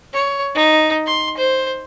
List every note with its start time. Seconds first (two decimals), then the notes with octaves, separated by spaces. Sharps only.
0.13 C#5
0.55 D#4
1.06 C6
1.38 C5